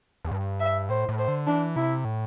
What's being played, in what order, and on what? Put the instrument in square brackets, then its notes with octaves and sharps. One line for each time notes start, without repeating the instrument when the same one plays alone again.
[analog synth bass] E2
G2
[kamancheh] E5
[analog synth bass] A2 [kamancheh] C5
[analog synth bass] A2
[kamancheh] C5
[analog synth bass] D3
[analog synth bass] E3 [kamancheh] D4
[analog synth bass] C3 [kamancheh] E4
[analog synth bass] A2